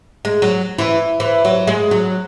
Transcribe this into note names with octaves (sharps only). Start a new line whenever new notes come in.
G#3
F#3
E3
E3
F#3
G#3
F#3